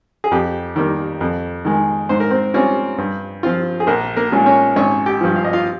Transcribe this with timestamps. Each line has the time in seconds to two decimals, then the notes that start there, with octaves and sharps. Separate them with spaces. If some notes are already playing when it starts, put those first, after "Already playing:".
0.24 G#4
0.31 F2 G4
0.76 D#3 G3 A#3
1.21 F2
1.65 D#3 G#3
2.09 G#2 C5
2.20 A#4
2.30 C4 C5
2.54 G3 C4 C#4 F4 C#5
2.98 G2
3.43 F3 C4 F4
3.80 G#4
3.87 A#1 A#3 A#4
4.16 A#3 A#4
4.32 A#2 G#3 C#4 F4
4.46 C#4 C#5
4.76 G#1 C#4 C#5
5.06 G4 G5
5.21 G2 F3
5.36 F5
5.44 D#5
5.53 F4 F5